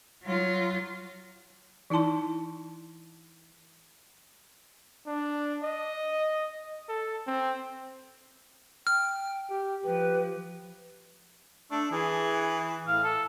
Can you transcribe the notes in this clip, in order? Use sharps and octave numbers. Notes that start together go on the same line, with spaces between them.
F#3 F4
E3 D#4 E4 A5 C6
D4
D#5
A4
C4
G5 F6
G4
F3 G4 B4
A3 D4
E3 G#4
A2 F5
A4